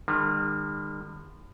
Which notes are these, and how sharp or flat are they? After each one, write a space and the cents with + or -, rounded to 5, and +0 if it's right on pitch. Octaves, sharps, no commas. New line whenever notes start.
D#3 -40 G3 +45